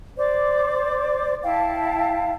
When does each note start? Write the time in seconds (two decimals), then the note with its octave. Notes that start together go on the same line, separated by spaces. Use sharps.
0.17 C5 D5 D6
1.44 E4 F5 G5 A5